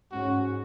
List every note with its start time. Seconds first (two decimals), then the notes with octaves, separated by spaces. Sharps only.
0.12 G#2 G#3 C#4 F#4